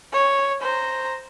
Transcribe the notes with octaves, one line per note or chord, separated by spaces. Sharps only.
C#5
C5 A#5